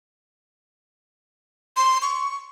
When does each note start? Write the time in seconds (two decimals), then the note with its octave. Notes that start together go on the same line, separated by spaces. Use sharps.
1.77 C6
2.02 C#6